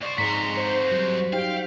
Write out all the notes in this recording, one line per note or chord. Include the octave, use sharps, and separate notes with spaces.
C2 C5 D5 C#6
F2 G#2 F#4 A#5 C6 B6
C5
F#3 G3
D#4 G4 C5 F5 G5